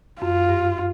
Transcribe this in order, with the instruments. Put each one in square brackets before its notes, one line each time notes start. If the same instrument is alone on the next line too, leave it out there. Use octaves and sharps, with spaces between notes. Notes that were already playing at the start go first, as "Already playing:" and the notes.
[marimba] F#2 [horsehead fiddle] F4
[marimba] G2